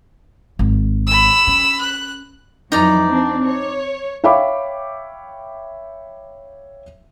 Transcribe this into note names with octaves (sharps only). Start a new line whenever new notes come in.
G#1
B5 E6
C#4
F#6
F2 E3 F#3 D#4 D5 A#5
C4 D4
C#5
C#5 E5 F5 G5 B5 D6